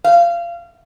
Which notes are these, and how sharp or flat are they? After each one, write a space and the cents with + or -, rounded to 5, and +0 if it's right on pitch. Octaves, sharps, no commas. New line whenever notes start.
F5 -25